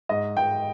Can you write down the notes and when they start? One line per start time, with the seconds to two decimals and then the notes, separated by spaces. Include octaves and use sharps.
0.09 G#2 D#5
0.37 G#2 G5